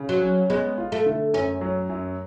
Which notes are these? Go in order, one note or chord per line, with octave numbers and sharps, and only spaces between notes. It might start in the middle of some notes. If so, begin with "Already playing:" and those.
Already playing: C#3
F#3
C#4
G#3 B3
F4
A3
D3
F#2 C#4
F#3
F#2